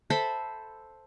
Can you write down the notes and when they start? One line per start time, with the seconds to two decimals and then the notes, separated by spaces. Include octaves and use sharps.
0.10 A4 C5 E5 B5